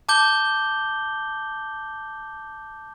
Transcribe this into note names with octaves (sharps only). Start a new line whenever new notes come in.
A5 D6 G6 G7